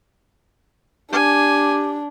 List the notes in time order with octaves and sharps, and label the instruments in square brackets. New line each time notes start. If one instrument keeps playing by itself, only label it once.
[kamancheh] D4 [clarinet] G4 [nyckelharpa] G#5